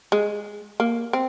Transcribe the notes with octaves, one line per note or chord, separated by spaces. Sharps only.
G#3
A#3
C4